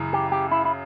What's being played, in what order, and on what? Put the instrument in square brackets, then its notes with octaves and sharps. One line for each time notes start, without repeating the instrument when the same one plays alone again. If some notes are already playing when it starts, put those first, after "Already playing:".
Already playing: [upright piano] F#2 C#3 E3
[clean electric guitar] G4
G4
E4
E4